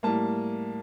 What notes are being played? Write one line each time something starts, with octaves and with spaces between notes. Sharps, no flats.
A2 G3 A#3 A5